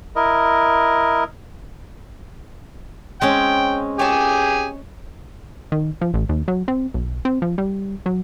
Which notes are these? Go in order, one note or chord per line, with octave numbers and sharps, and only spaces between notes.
E4 A#4 D#5
G#3 C4 C#4 G5
G4 G#4 C#5 G#5 A5
D#3
F3
A1
D#2
F#3
C4
B1
C4
F3
G3
F#3